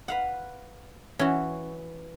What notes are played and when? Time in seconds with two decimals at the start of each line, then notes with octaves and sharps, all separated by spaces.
0.08 B4 F5 F#5
1.19 E3 C#4 F#4